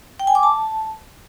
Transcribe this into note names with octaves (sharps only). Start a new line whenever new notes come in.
G5
G#5
D6
A5